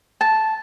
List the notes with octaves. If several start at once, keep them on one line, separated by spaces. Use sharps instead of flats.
A5